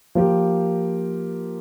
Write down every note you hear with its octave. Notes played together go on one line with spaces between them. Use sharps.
F3 A#3 G4 A#4